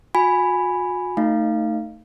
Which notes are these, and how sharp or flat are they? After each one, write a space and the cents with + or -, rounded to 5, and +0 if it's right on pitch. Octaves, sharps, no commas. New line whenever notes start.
F#4 -40 G#5 +0 B5 +0
A3 +15 D#4 +0 F5 -20